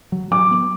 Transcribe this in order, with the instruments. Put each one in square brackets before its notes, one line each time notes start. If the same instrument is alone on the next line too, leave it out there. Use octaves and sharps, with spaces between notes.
[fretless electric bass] F#3
[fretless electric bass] F#3 [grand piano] D6
[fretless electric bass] B3